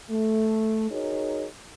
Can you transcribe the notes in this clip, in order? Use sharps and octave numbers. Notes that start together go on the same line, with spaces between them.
A3
D#4 F#4 G#4 A#4 C#5